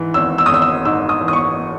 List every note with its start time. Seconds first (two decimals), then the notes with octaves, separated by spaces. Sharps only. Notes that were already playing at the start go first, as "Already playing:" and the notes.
Already playing: G#2 E3
0.14 G#1 E6
0.38 E6
0.46 D#6
0.50 G#1 E6
0.62 E6
0.85 G#2 E6
1.09 D#6
1.21 E3
1.28 D#6
1.33 C#6